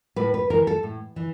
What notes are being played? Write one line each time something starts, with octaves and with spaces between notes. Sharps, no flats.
A2 B4
B4
E3 A#4
A4
A2
E3